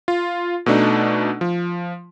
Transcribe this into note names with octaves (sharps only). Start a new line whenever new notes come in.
F4
B2 A3 D4 D#4
F3